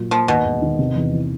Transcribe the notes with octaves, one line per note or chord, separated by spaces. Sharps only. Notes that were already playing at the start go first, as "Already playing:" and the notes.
Already playing: A#2 F#3
F3 A#3
D#2 B2
E1
D#3
C3
E2
E3